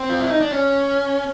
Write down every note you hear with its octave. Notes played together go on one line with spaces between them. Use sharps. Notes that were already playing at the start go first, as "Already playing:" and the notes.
Already playing: C4
F4
E4
D#4
D4
C#4